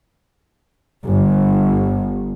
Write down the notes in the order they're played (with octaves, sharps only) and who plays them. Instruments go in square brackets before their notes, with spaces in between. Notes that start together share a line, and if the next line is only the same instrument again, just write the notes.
[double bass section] G1